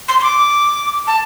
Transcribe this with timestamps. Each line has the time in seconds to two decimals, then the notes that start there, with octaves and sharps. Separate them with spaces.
0.08 C6
0.19 C6
0.23 D6
1.07 A5